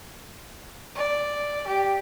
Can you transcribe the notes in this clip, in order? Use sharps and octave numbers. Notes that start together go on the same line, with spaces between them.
D5
G4